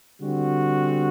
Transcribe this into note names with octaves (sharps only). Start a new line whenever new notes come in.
D3 G3 C4 F#4